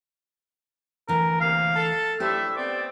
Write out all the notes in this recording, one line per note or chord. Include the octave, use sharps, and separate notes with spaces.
D2 E3 A#4
C3 A#3 F5
A4 A5
A2 A3 D4 G4 C5 E5
A3 B3 C4 D5